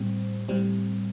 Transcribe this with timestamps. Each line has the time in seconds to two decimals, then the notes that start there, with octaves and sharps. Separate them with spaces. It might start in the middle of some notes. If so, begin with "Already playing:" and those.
Already playing: A2 G3 C4
0.48 A2 G3 C4